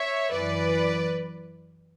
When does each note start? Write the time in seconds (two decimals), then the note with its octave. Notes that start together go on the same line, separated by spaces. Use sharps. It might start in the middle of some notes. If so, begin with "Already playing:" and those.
Already playing: C#5 E5
0.30 F#2 E3 B4 D5